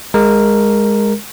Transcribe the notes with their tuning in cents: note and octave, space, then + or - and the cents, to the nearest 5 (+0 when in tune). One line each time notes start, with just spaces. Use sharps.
G#3 -10 A#4 +0